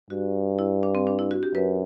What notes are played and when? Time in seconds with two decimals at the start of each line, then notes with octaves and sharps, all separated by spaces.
0.10 G2 F#4
0.59 E4
0.83 D4
0.95 C4
1.07 D4
1.19 E4
1.31 F#4
1.43 G4
1.55 F#2 B4